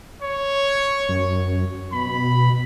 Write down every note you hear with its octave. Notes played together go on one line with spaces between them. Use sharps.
C#5
F#2
B2 B5